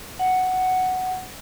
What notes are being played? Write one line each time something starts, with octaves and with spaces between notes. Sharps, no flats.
F#5